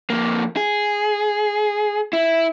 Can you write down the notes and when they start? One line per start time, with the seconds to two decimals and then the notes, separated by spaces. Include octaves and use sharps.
0.10 F2 A#3
0.57 G#4
2.13 E4